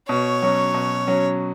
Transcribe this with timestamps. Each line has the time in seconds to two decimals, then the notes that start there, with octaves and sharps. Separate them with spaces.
0.08 B2 C#5
0.42 F#3 C#4
0.74 B2
1.07 F#3 C#4